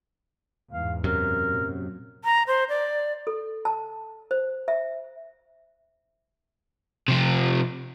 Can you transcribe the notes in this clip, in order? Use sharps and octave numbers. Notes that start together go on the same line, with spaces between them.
E2 G#2 F5
F#2 C3 A#4
A#2 F#3
A#5
C5
D5
A4
A5
C5
E5
C3 F3